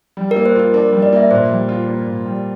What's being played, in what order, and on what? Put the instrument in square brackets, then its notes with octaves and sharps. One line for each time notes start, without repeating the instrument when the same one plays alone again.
[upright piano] G3
[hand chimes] A#4
[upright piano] A#3
[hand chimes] C5
[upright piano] F4 [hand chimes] A#4
[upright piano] D4 [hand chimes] A#4
[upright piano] G3
[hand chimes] D5
[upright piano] A#3 [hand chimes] E5
[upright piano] A#2 [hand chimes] C5
[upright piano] G3
F4
A#3
A#2
G3